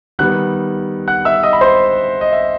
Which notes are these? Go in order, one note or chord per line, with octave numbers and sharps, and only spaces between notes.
D#3 G3 B3 F#5 F#6
F#5 F#6
E5 E6
D#5 D#6
B5
C5 C6
D#5
E5